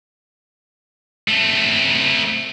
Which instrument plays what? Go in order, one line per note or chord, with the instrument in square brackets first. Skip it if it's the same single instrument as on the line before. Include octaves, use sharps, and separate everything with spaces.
[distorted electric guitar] A3 C4